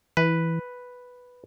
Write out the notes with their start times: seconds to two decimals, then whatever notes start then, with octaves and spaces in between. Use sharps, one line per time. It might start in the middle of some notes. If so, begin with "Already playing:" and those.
0.17 E3 B4